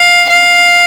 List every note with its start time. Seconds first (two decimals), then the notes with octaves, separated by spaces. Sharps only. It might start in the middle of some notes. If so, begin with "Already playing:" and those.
Already playing: F5
0.29 F5